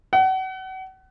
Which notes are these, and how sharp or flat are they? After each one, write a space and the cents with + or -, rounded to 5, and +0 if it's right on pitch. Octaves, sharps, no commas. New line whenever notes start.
F#5 +35